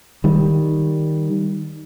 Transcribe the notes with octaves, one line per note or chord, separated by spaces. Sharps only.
D#3 G3